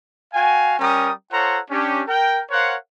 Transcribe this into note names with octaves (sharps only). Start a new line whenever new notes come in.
F#4 F5 G5 G#5
G3 C#4 A#4 G5 A#5 D#6
F4 A4 C5 C#5 F#5 A#5
C#4 D4 G4
A#4 G5
A#4 C5 C#5 F5 F#5